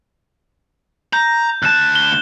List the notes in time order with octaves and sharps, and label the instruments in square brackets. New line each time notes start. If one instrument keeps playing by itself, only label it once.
[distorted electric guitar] A#5 [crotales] G6
[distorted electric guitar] D2 A5 [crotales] F#6 E7
[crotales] G7